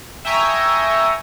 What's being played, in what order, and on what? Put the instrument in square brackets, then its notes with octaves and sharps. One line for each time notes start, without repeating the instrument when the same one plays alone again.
[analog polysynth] E5 G5 G#5 A#5 C#6 D#6